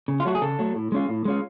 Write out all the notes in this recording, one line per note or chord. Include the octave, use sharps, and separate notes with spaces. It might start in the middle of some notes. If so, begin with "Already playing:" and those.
C#3
F4
F#3 A3 F#4
G#4
C#3 A4
F#3 A3
A2
G#3 C#4 F4
A2
G#3 C#4 F4